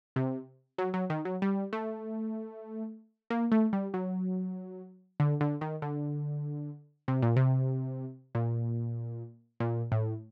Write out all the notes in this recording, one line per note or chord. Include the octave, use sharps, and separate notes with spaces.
C3
F#3
F#3
D#3
F#3
G3
A3
A#3
A3
G3
F#3
D3
D3
D#3
D3
C3
A#2
C3
A#2
A#2
A2